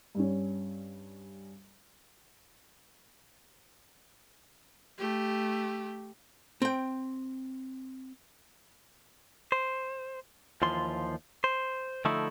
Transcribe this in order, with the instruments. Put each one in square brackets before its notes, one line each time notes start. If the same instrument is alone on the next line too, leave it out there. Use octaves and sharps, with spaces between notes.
[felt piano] G2 G3 C#4
[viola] A3 G4
[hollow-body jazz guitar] C4 G5
[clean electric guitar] C5
D#2 E3 F3 F4 C6
C5
D3 F3 A3 D#4 E4